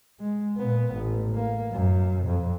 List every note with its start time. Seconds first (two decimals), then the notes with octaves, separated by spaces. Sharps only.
0.20 G#3
0.57 A#2 B3
0.93 A1
1.35 A#3
1.72 F#2
2.26 F2